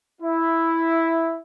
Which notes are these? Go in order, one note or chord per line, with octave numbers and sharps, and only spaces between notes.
E4